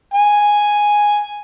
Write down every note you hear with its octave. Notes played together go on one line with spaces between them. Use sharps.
G#5